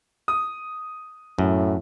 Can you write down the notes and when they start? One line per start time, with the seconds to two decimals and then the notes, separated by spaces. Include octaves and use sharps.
0.28 D#6
1.38 F#2 A2